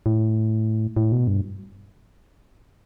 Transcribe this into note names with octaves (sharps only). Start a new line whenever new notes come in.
A2
A2
B2
G2